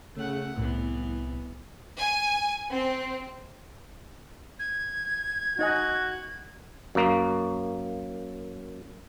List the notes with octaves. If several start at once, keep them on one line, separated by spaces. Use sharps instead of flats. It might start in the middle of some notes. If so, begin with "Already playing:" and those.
C#3 A3 F#5
C2 A2 E3 B3
G#5
C4
G#6
D#4 F#4 D#5 G#5
F#2 A#3